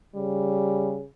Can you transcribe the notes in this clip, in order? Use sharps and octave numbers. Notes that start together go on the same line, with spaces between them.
C#3 G3